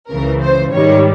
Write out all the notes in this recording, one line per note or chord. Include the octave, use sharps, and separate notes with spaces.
C#2 C#3 E3 A#4
C5
G#2 D#3 G3 C#5